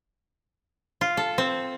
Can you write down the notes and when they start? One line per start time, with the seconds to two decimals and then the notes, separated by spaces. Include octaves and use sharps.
1.01 F4
1.17 A4
1.38 C4